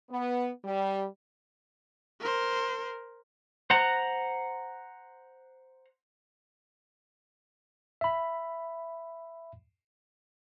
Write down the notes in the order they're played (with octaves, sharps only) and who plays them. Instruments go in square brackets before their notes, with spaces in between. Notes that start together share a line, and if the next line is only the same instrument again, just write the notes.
[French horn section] B3
G3
[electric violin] A#4 C5
[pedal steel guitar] C5 F#5 A#5
[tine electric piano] E5 B5